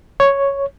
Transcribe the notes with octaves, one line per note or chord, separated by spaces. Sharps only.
C#5